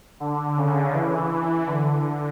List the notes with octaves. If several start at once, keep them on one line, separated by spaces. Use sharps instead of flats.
D3
C#3
E3
D3